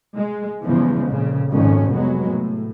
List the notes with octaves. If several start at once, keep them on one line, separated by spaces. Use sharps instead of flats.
G#3
E2 G2 C#3 F3 G#3
F2 A#2 C#3
G#1 F2 C#4
F1 F#3 G#3 B3
A2